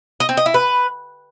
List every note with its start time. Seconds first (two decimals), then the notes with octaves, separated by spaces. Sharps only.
0.20 D#5
0.29 C4
0.37 D#5
0.46 E4
0.54 B4